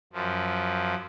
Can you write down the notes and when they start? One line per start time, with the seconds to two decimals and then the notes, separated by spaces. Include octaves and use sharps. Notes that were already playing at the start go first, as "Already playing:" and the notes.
0.13 F#2 F3